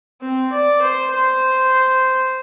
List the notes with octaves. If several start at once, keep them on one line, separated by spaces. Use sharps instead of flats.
C4
D5
C5
C5